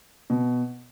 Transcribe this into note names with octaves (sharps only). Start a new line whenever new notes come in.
B2